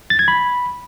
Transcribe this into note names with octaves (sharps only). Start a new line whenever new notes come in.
A6
G#6
B5